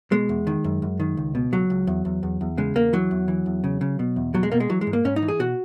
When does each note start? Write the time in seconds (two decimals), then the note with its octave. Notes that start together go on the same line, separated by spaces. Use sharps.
0.11 B2 G#3
0.29 E2
0.47 D#3
0.64 F#2
0.82 F#2
1.00 D#3
1.17 C#2
1.35 B2
1.52 C#2 F#3
1.70 C#2
1.87 E2
2.05 E2
2.23 E2
2.41 E2
2.58 C#3 G#3
2.75 E2 A#3
2.93 E3 F#3
3.11 E2
3.28 E3
3.46 E2
3.64 C#3
3.81 C#3
3.99 B2
4.16 E2
4.34 B2 F#3
4.43 G#3
4.52 B2 A#3
4.60 G#3
4.69 E3 F#3
4.81 G#3
4.87 G#2
4.93 A#3
5.05 G#2 C#4
5.16 D#4
5.22 E3
5.28 G#4
5.39 B2 F#4